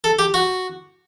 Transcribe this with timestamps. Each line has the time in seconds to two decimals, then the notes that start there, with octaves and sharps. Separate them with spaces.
0.04 A4
0.19 G4
0.34 F#4